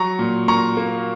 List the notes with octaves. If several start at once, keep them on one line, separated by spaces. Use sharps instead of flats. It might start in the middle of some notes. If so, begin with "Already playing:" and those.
Already playing: F#3 A#5 C#6
A#2
A#2 A#5 C#6
A#3